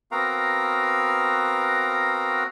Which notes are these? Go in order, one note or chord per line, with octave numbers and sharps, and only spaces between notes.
B3 C4 F#4 A#4 F5 A#5